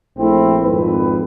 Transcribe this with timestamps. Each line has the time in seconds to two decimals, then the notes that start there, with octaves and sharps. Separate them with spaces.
0.18 A#1 A3 C4 E4
0.64 G#1 F2 B4